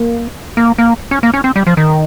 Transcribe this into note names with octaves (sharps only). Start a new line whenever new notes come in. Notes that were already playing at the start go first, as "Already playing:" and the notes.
Already playing: A#3
A#3
A#3
C#4
A#3
C#4
C4
G3
F3
D#3